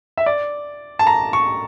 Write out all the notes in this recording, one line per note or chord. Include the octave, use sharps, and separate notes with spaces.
E5
D5
A5
A#5
C#6